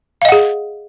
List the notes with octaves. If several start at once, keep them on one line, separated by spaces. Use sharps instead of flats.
G#4 D#5 F5 F#5